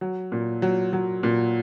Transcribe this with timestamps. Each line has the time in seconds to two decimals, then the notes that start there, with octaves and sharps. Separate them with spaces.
0.01 F#3
0.32 A#2
0.62 F#3
0.93 F#3
1.23 A#2